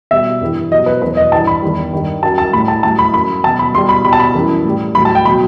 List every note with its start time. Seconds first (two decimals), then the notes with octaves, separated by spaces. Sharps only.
0.11 B2 G3 E5
0.41 G2 E3 G3
0.71 F#3 D#5
0.74 B2
0.86 B4
1.02 E2 B2 F#3 B4
1.17 D#5
1.32 G2 E3 G3 A5
1.47 B5
1.62 E2 D#3 G3
1.93 G2 D#3 G3
2.23 F#2 F#3 A5
2.38 A5
2.53 A2 G3 B5
2.68 A5
2.83 A2 F#3 A5
2.99 B5
3.14 F#2 F#3 B5
3.44 F#3 A5
3.47 B2
3.59 B5
3.74 B2 C6
3.78 G3
3.89 B5
4.04 B2 G3 B5
4.13 A5
4.20 B5
4.35 F#2 E3 G3
4.65 A2 G3
4.95 A2 F#3 B5
5.05 A5
5.15 G5
5.25 B2 F#3 B5